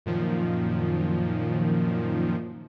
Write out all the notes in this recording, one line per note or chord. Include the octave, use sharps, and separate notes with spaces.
F#2 A#2 D#3 F3